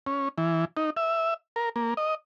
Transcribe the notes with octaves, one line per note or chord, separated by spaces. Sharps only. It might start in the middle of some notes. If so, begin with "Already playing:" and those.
C#4
E3
D#4
E5
A#4
A#3
D#5